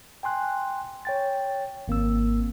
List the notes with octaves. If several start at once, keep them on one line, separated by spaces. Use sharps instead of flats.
G5 G#5 C6 F#6
C#5 G5 A6
G#1 A#3 C4 E6